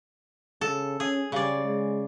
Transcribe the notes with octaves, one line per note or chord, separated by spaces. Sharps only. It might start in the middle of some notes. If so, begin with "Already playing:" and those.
C#3 A4
C#4 G#4
C#3 G3 D5
G#3